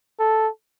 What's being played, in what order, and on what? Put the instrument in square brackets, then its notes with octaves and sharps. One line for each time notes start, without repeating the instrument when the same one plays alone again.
[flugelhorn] A4